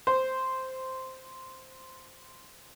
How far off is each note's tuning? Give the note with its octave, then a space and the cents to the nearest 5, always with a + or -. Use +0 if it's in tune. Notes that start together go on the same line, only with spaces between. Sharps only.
C5 -5